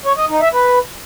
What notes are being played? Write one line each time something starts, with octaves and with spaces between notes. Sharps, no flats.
C#5
D#5
D#4
E5
B4